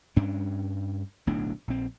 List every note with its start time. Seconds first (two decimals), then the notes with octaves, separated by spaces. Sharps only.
0.16 G2 C#4 D4
1.27 D1 B1 A2 D4
1.67 A#1 C4